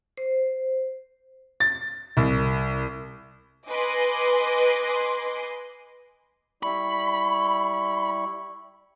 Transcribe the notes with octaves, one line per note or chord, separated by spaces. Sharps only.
C5
A6
C2
B4 D#5 G#5 C6 D6
G3 E4 B5 C#6